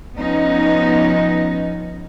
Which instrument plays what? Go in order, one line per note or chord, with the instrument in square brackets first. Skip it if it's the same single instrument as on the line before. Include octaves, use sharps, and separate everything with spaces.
[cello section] F3 B3 C#4 D#4